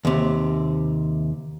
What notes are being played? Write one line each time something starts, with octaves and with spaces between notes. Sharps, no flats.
D#2 C3